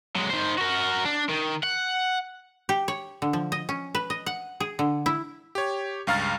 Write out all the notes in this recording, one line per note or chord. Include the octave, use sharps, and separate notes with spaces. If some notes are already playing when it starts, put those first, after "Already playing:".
F#3 G#3
D#3 C5
F#4 A#4
D4
D#3
F#5
G4
C#5
D3
F3
D#5
C#4
B4
D#5
F#5
G#4
D3
E4
G4 C#5
C#2 G2 F5 A#5 F6 A6